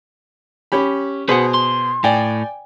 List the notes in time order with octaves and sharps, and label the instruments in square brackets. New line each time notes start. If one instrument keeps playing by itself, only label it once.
[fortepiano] C#4 G4 B5
[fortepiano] B2 G#4 C5 [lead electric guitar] B4 F#5
[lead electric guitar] C6
[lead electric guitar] A2 [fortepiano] D5 G5 G#5